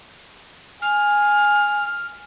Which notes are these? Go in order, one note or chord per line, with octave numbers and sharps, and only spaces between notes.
G#5 F6